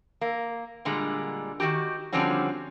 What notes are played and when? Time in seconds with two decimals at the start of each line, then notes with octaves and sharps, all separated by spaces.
0.21 A#3
0.85 A#2 D3 G3 G#3
1.60 D#3 F#3 F#4 G4
2.12 D3 F3 G3 C4 C#4 F#4